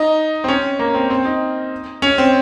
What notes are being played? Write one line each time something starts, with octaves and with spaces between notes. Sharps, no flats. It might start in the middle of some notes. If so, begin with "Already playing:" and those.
Already playing: D#4
C4
C#4
A#3
C4
C4
D#4
C#4
C4